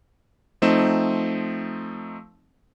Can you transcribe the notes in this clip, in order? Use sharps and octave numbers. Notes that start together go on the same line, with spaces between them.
F3 A3 C4 D#4 E7